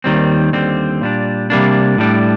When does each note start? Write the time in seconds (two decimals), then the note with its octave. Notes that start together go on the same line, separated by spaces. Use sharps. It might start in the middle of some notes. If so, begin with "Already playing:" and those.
0.04 D#2 D#3 G3 C4
0.52 D#2 D3 G3 C4
1.01 A#2 G3 D4
1.50 C3 G3 A#3 D4
1.98 A2 G3 D4